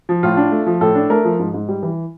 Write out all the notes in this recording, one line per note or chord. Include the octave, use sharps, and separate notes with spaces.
F3
A2 F4
D4
A3
F3
A2 A4
D4
A3 A#4
F3
G#2
G#2
G3
E3